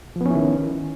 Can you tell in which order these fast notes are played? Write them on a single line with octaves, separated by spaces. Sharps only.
F3 B3 C#4 E4 D#3